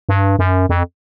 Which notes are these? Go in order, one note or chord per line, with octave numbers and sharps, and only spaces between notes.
G2
F#2
F2